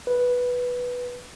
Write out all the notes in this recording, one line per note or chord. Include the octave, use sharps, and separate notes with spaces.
B4